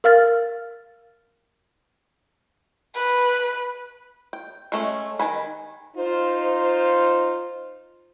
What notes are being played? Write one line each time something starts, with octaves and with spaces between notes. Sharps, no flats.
A#4 F5 F6 A6
B4
G5
G#3 A3 C#4
D#3 G#5 B5
D#4 F4 C5